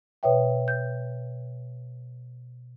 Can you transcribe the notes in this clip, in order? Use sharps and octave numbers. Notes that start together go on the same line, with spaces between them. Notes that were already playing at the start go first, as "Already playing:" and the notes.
B2 B4 C#5 E5 G5
G6